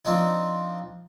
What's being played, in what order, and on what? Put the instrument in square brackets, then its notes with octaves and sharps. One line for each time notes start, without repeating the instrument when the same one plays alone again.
[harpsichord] F3 C4 D4 D#4